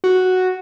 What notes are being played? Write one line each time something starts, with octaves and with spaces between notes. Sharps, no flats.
F#4